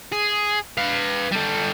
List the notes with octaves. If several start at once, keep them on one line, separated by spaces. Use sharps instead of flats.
G#4
B4 F5
G3 A4